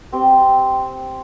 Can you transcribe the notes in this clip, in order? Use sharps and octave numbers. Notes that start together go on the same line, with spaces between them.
C4 G4 C5